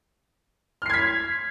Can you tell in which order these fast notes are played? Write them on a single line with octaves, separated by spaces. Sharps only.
F6 C7 G#6 B6